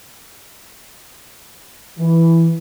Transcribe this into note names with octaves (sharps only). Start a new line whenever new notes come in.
E3